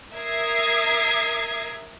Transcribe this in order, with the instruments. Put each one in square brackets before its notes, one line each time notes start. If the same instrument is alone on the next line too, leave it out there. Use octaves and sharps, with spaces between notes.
[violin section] A#4 E5 D#6 G#6 C7